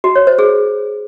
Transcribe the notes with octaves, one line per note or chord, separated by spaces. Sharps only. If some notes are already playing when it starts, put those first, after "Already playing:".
F#4
C#5
C5
G#4